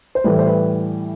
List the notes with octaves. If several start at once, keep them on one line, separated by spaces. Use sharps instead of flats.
C5
A2 E3 G3 B4
C5
B4